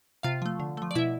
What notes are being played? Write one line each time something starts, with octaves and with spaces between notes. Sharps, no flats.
C3 F4 F5
F3 A3
D3
F3 A3
D5
B2 E4 E5